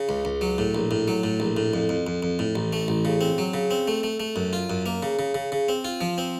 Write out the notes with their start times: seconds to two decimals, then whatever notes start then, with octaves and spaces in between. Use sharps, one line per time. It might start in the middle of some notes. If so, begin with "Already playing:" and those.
Already playing: C#3
0.09 C#2
0.25 C#2
0.41 F#3
0.58 A2
0.75 A#1
0.91 A2
1.08 F#3
1.24 A2
1.40 A#1
1.57 A2
1.74 F2
1.89 F2
2.07 F2
2.23 F2
2.39 A2
2.55 A1
2.73 A3
2.88 A1
3.05 C#3
3.21 C4
3.38 F#3
3.54 C#3
3.71 C4
3.88 A3
4.03 A3
4.20 A3
4.36 F#2
4.53 F4
4.70 F#2
4.86 A#3
5.03 C#3
5.19 C#3
5.34 C#3
5.52 C#3
5.69 C4
5.85 F4
6.01 F3
6.18 C4